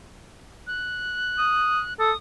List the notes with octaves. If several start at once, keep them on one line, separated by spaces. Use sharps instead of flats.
F#6
D#6
A4 D#6